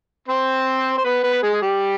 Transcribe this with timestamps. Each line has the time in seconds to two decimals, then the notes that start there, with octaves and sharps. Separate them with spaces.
0.28 C4 C5
0.98 C5
1.04 B3 B4
1.23 B3 B4
1.43 G#3 G#4
1.53 G#4
1.62 G3 G4